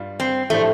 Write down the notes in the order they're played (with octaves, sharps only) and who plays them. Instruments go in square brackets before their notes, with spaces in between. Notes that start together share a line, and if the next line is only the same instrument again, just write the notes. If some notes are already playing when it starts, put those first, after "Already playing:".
Already playing: [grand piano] G2 G3 F4
[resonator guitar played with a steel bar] C4
[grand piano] A2 F3 D4 G4 C5 [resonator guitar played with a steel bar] A3